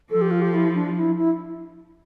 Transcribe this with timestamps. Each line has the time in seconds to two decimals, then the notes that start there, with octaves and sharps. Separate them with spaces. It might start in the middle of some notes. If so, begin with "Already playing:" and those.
0.11 F3 A4
0.21 G4
0.31 F4
0.42 G4
0.54 E4
0.75 D4
0.96 E4
1.18 E4